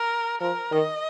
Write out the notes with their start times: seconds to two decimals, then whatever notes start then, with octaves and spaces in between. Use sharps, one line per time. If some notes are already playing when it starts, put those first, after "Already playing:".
Already playing: A#4
0.41 F3 A#4
0.72 D#3 D#5